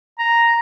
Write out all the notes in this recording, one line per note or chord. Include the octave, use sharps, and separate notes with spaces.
A#5